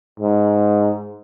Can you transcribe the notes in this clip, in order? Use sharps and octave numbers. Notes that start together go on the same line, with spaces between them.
G#2